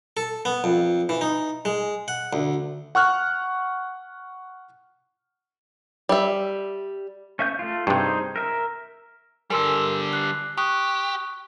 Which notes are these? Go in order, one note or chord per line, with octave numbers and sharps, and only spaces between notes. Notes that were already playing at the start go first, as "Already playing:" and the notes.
A4
B3
F2
E3
D#4
G#3
F#5
D2
F#5 C#6 F6 F#6
G3 E5
C#4 E5 G6
A3 F4
G2 C3 D#4 G#4 C5
A#4 E5
D3 G3 A4 A#4 G#5 C6 E6
F#6 C7
G4 C#6 D#6 F#6